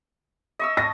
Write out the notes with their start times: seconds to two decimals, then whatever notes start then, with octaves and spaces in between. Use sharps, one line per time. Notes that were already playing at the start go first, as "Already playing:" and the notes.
0.59 D#5 C#6 E6
0.77 A5 A#6